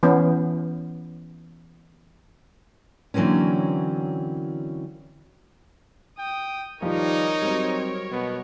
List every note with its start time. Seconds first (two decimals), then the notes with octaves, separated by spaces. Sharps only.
0.03 E3 B3 C#4
3.14 D3 E3 F#3 A#3 C4 C#4
6.19 G5 D#6
6.82 D#3 F3 G3 D#4 A#4 C#5
7.42 F#3 G3 C4
8.11 B2 B3